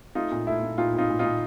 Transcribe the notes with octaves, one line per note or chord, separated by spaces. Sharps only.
A3 D#4 F4
A#2
A3 E4
A#2
A#2 D#4 F4
A#2 D#4 F4
A#2
D#4 F4
A#2